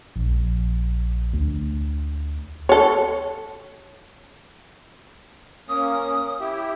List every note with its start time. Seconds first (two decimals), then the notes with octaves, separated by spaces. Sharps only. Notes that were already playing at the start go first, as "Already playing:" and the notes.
0.16 A#1
1.34 D2
2.69 A4 C#5
5.68 A#3 C#4 D#6
6.40 E4 G4